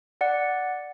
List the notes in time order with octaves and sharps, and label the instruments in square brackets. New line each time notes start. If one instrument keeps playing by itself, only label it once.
[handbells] D5 F#5